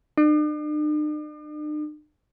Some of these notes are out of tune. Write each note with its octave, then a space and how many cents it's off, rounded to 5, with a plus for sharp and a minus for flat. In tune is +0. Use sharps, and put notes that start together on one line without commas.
D4 +45